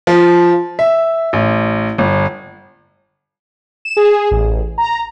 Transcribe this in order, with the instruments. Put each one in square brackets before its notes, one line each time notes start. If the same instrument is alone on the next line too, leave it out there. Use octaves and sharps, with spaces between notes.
[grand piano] F3
E5
A1
G1
[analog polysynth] E7
G#4
A1
A#5